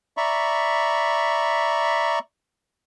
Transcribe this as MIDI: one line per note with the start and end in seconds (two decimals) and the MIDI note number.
0.17 2.19 74
0.17 2.19 76
0.17 2.19 82
0.17 2.19 83
0.17 2.19 85